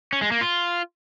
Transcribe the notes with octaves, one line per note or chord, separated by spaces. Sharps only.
C#4
G#3
A#3
F4